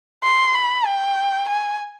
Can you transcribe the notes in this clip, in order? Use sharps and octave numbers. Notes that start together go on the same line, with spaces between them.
C6
B5
G5
G#5